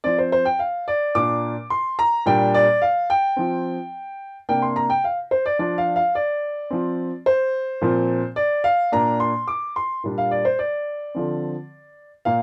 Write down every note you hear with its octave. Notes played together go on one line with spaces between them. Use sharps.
F3 C4 D5
C5
C5
G5
F5
D5
A#2 A#3 D4 D6
C6
A#5
A#2 G3 D4 G5
D5
F5
G5
F3 C4
C3 A#3 D4 G5
C6
A#5
G5
F5
C5
D5
F3 D4 D5
F5
F5
D5
F3 C4
C5
A#2 F3 C4
D5
F5
A#2 A#3 D4 A#5
C6
D6
C6
A#2 G3 D4
F5
D5
C5
D5
D3 F3 C4
A#2 A#3 F5